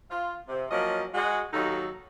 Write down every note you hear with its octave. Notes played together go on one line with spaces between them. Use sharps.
F4
C3
F3 F#3 A#3 C#4 D#5
G#3 F#4
D#2 F#3 D#4 A4